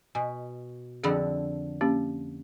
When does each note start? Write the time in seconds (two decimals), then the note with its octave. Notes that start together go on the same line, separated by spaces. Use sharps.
0.15 B2 G#5
1.04 F2 D3 G#4 F#5 B5
1.81 A#3 C#4 G4